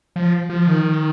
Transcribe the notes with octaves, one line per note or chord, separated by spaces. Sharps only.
F3
F3
D#3